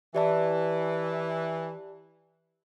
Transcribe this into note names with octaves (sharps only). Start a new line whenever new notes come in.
E3 G4 D5 A5